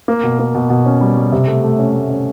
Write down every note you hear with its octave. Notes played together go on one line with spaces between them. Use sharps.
A#3
B2
A#3
B2
B2
C#4
G3
G3
C3
A3
A3
C#4
A3
C#4